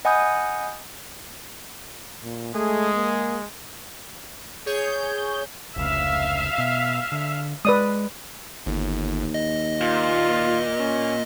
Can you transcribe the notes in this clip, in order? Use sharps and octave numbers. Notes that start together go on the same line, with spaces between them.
D#5 F#5 G#5 B5 D#6 G6
A#2
G#3 A3 G#4
A#3
G#4 C#5 G6
F1 C#2 E5 F5
B2
D3
G#3 B4 D5 D#6
G1 D#2
D#5
A#2 F4
C#4